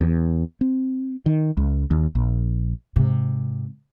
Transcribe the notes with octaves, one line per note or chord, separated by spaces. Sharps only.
E2
C4
D#3
C#2
D#2
A#1
G#2 C3